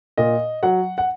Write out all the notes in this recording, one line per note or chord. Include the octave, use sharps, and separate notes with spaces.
A#2 D#5
F#3 F#5
F#5